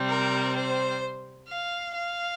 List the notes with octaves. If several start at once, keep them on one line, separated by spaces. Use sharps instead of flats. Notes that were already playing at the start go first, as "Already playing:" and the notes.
Already playing: C3 G3 C4
A#4
C5
F5
F5